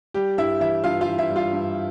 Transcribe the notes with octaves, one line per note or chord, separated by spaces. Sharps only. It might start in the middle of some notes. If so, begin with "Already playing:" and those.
G3 G4
G2 E4 E5
E3 E4 E5
G2 F4 F5
F4 F5
E3
E4 E5
G3
F4 F5
G2